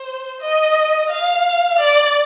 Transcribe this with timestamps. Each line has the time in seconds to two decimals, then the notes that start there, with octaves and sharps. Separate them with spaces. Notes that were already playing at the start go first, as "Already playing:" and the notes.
Already playing: C5
0.41 D#5
1.10 F5
1.79 D5